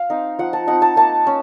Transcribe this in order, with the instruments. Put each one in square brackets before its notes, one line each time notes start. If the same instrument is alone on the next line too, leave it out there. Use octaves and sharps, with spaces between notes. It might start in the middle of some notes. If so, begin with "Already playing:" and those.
Already playing: [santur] F5
C4 D#4
F3 F#5
A5
C4 D#4 F#5
A5
A#3 A5
C#4